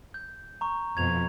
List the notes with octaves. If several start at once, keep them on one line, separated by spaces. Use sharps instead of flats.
G6
A#5 C#6
F2 B2 F3 G#6 F7